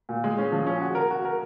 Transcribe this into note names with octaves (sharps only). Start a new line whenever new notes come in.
A#2
G#3
C#4
F3
C#4
F#4
A#4
F#4
A#4